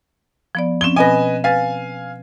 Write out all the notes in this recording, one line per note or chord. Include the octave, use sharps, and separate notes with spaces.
F3 B3 D5
F3 C4 C#4 E7 G7
B2 B4 D#5 G#5 A#6
B4 F5 G#5 A6